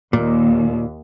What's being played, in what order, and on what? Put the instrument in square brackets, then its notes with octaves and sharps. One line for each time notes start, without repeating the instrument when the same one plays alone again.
[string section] D#2 [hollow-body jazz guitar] A#2